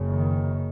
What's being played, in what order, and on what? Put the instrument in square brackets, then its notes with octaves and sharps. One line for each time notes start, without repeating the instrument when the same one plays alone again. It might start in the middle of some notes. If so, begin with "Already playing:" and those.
Already playing: [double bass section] F#1 F#2 C#3
D#3